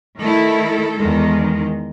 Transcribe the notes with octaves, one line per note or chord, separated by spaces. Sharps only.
D#3 A3 E4 A4
E2 D#3 G#3